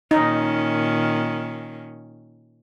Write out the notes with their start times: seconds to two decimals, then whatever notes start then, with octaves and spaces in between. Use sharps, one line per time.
0.11 A#2 D#3 C#4 D#4